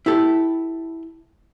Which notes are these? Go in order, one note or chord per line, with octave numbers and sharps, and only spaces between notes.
E4 G4 A4